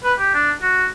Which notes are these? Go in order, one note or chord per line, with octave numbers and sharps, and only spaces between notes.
B4
G4
D4
F#4